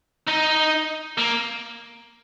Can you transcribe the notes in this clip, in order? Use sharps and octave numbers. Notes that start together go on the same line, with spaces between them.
D#4
A#3